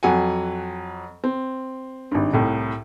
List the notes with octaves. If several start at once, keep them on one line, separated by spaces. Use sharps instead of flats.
F2 F#3 F#5 G#5
C4
G#1 G2
C2 A2